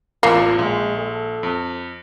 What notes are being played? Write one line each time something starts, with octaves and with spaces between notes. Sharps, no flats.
A1 E2 A#3 F4 C7
A#1 G#3
A4
F2